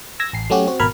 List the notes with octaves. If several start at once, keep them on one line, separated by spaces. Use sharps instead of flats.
E6 G#6 A#6
A1 C7
F#3 A3 C#4 F#4 G4
C4 F#4
G#1 B2 A#4 B5 F6 G#6